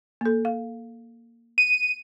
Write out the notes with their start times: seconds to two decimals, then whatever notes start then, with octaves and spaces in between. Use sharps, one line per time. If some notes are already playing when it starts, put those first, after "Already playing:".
0.21 A#3 A4
0.45 F5
1.58 D#7